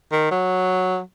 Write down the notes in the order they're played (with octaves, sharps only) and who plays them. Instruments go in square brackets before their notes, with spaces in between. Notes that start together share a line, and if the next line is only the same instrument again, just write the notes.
[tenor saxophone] D#3
F#3